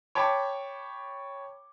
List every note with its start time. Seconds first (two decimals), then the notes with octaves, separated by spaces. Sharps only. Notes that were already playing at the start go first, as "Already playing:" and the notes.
0.15 C#5 G5 A5 B5 D6